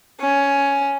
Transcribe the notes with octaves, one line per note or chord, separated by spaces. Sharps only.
C#4